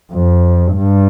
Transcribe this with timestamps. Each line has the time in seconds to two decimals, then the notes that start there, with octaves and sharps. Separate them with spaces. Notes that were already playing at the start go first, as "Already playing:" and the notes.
0.12 F2
0.76 G2